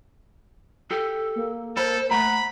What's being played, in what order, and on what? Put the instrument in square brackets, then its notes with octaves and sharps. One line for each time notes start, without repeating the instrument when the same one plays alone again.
[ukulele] G4 [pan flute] A4
[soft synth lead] A#3
[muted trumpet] A4 [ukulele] A#4 B5 [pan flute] C5
[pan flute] A3 [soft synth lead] F#5 [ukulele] A#5 [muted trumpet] B5